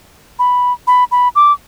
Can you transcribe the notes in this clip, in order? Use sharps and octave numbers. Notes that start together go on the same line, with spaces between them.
B5
B5
B5
D6